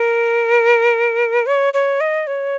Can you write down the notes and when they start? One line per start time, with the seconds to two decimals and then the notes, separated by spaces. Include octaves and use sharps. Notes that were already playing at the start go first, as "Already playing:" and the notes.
Already playing: A#4
1.46 C#5
1.74 C#5
2.01 D#5
2.27 C#5